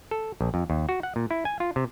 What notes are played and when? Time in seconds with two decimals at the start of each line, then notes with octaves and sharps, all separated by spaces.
0.11 A4
0.41 A#1
0.54 F2
0.70 D#2
0.89 F#4
1.03 F#5
1.16 A#2
1.31 E4
1.45 G#5
1.60 F4
1.76 C3